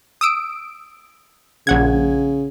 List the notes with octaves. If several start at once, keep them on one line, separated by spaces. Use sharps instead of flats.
D#6 E6 D7
A#1 C#3 F#5 G#6